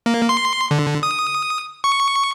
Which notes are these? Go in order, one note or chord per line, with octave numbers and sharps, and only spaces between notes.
A#3
C6
D3
D#6
C#6